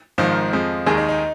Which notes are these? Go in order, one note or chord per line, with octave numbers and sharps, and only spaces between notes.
G#1 G#2 D#3 F3 F4
F2 F3 G#3
D#2 D#3 G#3 G#4
D#4
D#4